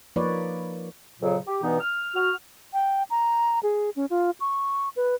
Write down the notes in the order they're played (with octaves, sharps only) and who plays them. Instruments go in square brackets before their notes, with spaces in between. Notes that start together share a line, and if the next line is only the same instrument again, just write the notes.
[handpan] F3 A#3 D#4 B4 C#5 D5
[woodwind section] F2 A#2 C#3 F#3
G4
G2 B2 E3 B3 D#4
F6
F#4 F6
[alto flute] G5
A#5
G#4
C#4
F4
C#6
B4